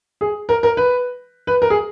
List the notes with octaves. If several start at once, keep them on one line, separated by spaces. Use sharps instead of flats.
G#4
A#4
A#4
B4
B4
A#4
G#4